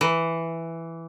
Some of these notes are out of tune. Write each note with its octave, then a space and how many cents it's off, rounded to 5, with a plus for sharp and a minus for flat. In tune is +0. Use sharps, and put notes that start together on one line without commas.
E3 +5